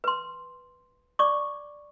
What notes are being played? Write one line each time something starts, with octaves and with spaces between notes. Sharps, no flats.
B4 C6
D5 C#6 D6